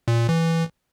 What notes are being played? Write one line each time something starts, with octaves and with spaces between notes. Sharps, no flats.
A#2
A#2
E3